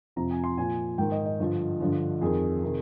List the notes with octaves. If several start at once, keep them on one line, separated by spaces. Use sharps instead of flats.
F2 C3 F3 A#5
G#5
C6
A#2 F3 G#5
G#2 D#3 G5
D#5
D#5
G2 D3 F3
G2 D3 F3
F2 D#3 G#4
C3 D#3